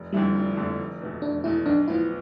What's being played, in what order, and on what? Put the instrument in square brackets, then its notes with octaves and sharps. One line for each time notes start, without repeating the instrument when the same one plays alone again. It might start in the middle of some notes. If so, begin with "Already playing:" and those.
Already playing: [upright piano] F1
[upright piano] F2 D3 A3 E4 [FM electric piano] G3
[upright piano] F1
F2 D3 A3 E4
F1
E2 B2 A3
[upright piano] F1 [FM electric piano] D4
[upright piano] E2 B2 A3 [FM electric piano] E4
[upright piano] B1 [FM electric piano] D4
[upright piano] A2 F3 B3 F4 [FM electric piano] E4